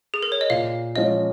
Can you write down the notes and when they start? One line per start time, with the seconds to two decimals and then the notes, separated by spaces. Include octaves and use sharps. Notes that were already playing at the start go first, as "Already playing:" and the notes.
0.14 G#4
0.23 A#4
0.32 C#5
0.41 D#5
0.50 A#2 F5
0.95 F3 G#3 C#4 F4 D#5